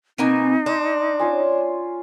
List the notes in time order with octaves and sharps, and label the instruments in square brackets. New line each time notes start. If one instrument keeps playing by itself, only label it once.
[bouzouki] B2 A#3 G#5 [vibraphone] C4 [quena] D#4
[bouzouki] D4 [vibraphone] C6
[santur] C#4 F4 G#5